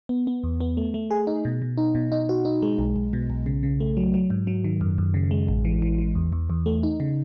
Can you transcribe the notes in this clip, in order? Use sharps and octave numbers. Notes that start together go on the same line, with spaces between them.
B3
B3
E2
B3
A3
A3
G#4
D#4
B2
B2
D#4
B2
D#4
F#4
D#4
G#3
B1
B1
B2
B1
C#3
C#3
A3
F#3
F#3
G#2
F#3
D#3
F#2
F#2
C#3
G#3
A1
E3
E3
E3
E2
E2
E2
A3
D#4
C#3